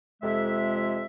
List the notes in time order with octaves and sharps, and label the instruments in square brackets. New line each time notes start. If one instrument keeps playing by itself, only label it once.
[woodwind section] F2 C3 G#3 E5